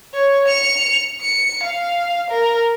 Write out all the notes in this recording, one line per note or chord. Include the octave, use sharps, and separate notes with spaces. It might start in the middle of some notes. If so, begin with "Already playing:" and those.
C#5
C#7 F7
C#7
F5
A#4